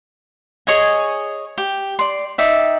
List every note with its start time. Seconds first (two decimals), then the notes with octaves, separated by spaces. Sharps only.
0.67 G#4 C#5 D#5 G#5
1.58 G4
1.99 D5 C6
2.38 D#4 D5 E5 G5